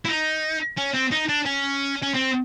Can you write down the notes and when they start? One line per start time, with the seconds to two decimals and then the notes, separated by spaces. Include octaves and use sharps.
0.05 E4
0.08 D#4
0.78 C#4
0.94 C4
1.12 D#4
1.29 D4
1.46 C#4
2.03 C#4
2.15 C4